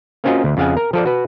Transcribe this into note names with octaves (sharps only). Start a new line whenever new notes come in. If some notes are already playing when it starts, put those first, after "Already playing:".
A#3 C4 C#4 F4 F#4 D#5
D2
F2 C#3 F5 F#5 G#5
A#4
F3 A4 D5
F#4 B4